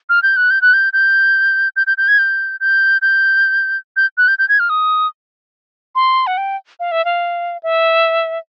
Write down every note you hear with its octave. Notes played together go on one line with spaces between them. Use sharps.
F6
G6
F#6
G6
F#6
G6
G6
G6
G6
G6
G#6
G6
G6
G6
G6
F#6
G6
G6
G#6
F6
D#6
C6
F#5
G5
F5
E5
F5
E5